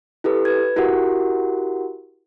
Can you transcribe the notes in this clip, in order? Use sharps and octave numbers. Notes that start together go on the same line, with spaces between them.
E4 G4 A4 B4
B4 G#6
E4 F#4 G4 A#4 F#5